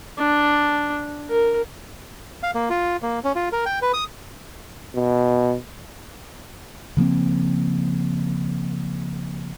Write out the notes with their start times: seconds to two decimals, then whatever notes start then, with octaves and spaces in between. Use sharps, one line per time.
0.18 D4
1.28 A#4
2.43 F5
2.55 A#3
2.70 F4
3.02 A#3
3.24 C#4
3.36 F4
3.52 A#4
3.66 G5
3.82 B4
3.94 D#6
4.95 B2
6.97 C#3 F3 A#3 C4